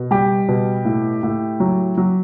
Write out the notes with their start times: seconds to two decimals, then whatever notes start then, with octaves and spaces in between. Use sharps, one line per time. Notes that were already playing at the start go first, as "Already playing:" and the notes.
Already playing: B2
0.11 G3 G4
0.48 B2
0.85 A2
1.23 A2
1.60 F#3
1.98 F#3